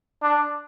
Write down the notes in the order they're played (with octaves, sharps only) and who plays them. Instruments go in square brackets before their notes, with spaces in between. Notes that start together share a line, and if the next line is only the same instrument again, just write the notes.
[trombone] D4